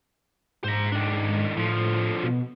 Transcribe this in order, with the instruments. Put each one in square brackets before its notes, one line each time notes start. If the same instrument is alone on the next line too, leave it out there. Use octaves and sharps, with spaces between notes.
[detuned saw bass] G#2 [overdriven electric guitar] C5 A#5
[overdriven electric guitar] D#3 D4
[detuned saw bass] A2 [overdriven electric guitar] D3 F3
[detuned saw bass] B2